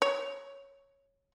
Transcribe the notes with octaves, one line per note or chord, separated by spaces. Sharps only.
C#5